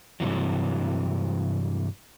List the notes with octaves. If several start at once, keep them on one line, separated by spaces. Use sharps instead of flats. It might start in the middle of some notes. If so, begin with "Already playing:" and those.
G2 C3 E3 F#3